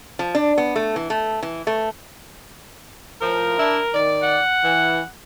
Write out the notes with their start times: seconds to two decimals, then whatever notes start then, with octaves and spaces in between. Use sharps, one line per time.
0.19 F3
0.35 D4
0.58 B3
0.76 A3
0.96 E3
1.10 A3
1.43 E3
1.67 A3
3.21 A2 F3 A#4
3.57 D4 E4
3.93 D#3 D5
4.22 F#5
4.62 E3